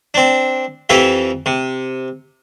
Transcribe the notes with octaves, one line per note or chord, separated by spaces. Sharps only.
C4 D4
F2 E3 E4 G4 E5 F5
C3